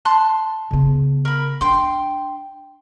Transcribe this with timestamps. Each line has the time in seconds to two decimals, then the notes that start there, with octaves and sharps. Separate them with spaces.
0.05 A5 C6 F#6
0.71 C#3 B3
1.25 A#4 B5
1.61 D4 G5 C6